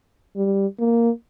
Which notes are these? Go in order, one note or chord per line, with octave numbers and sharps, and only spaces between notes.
G3
A#3